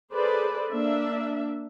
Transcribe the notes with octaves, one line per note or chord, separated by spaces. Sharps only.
G#4 A4 B4 C5 D5
A#3 D4 E5